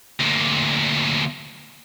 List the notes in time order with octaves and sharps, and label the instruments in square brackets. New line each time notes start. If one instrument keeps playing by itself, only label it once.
[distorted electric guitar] D2 A#2